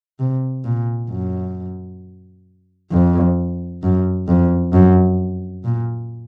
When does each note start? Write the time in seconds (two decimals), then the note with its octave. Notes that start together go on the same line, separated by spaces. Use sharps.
0.19 C3
0.65 A#2
1.10 F#2
2.91 F2
3.83 F#2
4.28 F2
4.73 F#2
5.64 A#2